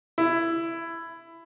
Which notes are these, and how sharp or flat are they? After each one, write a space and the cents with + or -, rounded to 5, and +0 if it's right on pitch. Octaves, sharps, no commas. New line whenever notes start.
E4 +15